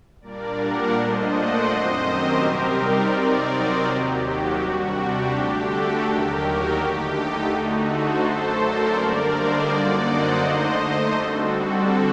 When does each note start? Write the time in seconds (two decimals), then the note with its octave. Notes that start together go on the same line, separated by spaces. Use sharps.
0.21 A#2 G3 A#3 D4 A#4 D5
0.57 D5 F#5
0.94 A#2 A3 D4 C5 D#5
1.29 D5 F#5
1.66 F#2 D#3 F#3 C4 C5 D#5
2.03 G4 A#4
2.39 C3 G3 C4 D#4
2.76 A#4 D5
3.12 C3 F#3 C4 D#4
3.49 C5 D#5
3.85 D#2 D#3 F#3 G4
4.21 F#4
4.57 C3 G3 D4
4.94 G4
5.31 D3 A3 D4 G4
5.67 F#4 A4
6.03 D#2 D#3 F#3 G4 A#4
6.41 F#4
6.77 D3 A3 D#4 G4
7.13 G4
7.49 D3 A3 D#4 F#4
7.87 A4 C5
8.22 F#2 F#3 A3
8.59 A#4 D5
8.96 D3 G3 A#3 D4
9.31 C5 D#5
9.68 F#2 D3 F#3 A#3 D#4 D5 F#5
10.04 C5 D#5
10.41 D3 A3 D#4
11.14 D3 G3 C4 F#4 A4
11.51 F#4 A4